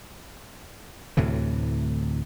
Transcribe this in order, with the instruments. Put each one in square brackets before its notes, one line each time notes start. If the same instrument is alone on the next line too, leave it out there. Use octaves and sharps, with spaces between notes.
[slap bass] D2 A2 C3 E3